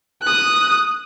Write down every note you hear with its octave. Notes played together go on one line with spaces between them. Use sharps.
D#6 F#6